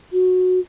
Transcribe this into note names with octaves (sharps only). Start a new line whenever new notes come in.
F#4